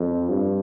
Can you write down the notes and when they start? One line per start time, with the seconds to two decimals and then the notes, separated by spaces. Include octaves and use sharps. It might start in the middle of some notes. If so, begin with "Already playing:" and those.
Already playing: F2
0.29 G2